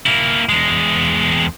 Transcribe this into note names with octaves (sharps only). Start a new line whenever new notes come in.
A#3 E4
E2 G#3